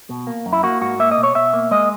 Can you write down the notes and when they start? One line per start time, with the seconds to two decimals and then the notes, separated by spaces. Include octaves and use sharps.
0.10 B2
0.27 A#3
0.46 F#2
0.53 E4
0.63 A#3 F#4
0.81 G#2 F#4
1.00 A#3 E5
1.11 D#5
1.18 B2
1.23 C#5
1.35 B2 E5
1.54 A#3
1.71 G#3 D#5